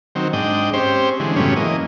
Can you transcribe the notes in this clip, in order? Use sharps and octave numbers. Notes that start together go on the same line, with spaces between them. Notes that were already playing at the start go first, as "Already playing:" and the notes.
D#3 F#3 C4
G#2 D4 D#5 G5
C4 C#4 G4 C5
D3 E3 G#3
F#2 A2 C#3 G3 B3 C#4
E3 A#3 D#5